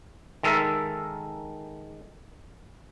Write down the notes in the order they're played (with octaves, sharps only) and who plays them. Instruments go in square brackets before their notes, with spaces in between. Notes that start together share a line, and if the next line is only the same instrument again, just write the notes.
[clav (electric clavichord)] D#3 G#3 A4 A#4 E5